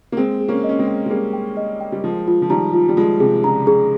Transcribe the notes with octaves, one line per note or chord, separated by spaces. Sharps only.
A#3
G#3 C4 G#4
G#4
A#3 C#4
D#5
C#4
G#3 C4
G5
G#3
G3 A#3 G#4
G5
D#5
G5
G3
F3 G#3 F4
F4
F3
D#3 G3 A#5
F4
G3
F3 G#3 F4
C3 G#4
C#3 A#5
C#3 G#4